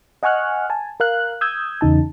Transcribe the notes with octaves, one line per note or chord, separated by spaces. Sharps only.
D#5 F#5 G#5 C#6 F6 F#6
G#5 A5
A#4 F5 F#6
D#6 E6 G6 G#6
E2 C#3 D#4 A5